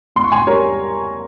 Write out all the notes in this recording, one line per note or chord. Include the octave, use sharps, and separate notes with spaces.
E2 C6
C#6
G#5 C6
G3 A#4 C#5